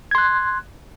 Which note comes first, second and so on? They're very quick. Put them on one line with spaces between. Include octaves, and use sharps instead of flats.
G#6 C6 F#6